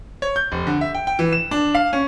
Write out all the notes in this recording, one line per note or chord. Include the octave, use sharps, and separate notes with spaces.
C#5
G6
F1
D3
E5
G5
G5
E3
E7
D4
F5
C#4